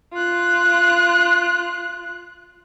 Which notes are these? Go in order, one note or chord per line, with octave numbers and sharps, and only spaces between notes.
F4 F#6